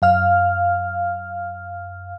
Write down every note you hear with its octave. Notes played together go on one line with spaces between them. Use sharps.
F#2 F5 F6